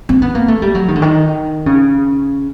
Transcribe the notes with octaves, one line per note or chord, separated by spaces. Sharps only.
C4
B3
A#3
A3
G3
F#3
D#3
D3
D#3
C#3